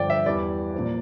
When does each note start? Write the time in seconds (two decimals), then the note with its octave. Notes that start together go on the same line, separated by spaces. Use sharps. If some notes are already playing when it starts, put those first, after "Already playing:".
Already playing: G2 D3 F3 D5 G5
0.10 E5
0.26 E2 E3 G3 D5
0.74 A#2 F3